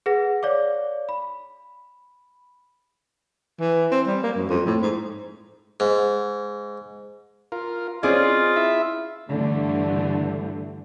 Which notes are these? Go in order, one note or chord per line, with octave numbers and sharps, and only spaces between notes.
G#4 B4 F#5 A#6
C#5 D5 F5 D6
B5
E3
C4
G3
A#3
F#2
F2
A2
G#2
G#2
F4 A#4
C4 C#4 F4 G#4 D5 D#5
E4 E5
G2 D3 E3 A3